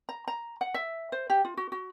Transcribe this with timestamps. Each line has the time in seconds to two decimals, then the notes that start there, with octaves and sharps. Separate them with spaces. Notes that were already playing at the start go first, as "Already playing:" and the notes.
0.09 A#5
0.28 A#5
0.61 F#5
0.74 E5
1.12 C5
1.30 G4
1.45 F4
1.57 F#4
1.72 F#4